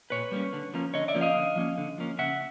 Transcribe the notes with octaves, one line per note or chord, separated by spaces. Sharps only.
A#2 B4 C#5
G3 A#3 C#4
D3
F3 A#3 C#4
D3 C#5 D#5
D5 E5
F3 A#3 C#4
D#5 F5
D3
F3 A#3 C#4
D3
F3 A#3 C#4
C#3 E5 F#5